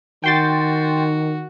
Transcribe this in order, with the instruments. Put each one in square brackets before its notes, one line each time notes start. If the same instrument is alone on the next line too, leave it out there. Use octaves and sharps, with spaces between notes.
[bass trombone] D#3 [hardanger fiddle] F#4 [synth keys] G5 C6 A6